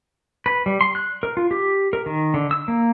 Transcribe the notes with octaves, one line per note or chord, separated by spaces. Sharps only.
B4
G3
C6
F#6
A#4
F4
G4
A#4
D#3
D3
E6
A#3